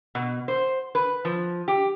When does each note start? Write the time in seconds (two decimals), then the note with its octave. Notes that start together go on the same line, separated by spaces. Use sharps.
0.15 B2
0.48 C5
0.95 B4
1.25 F3
1.68 G4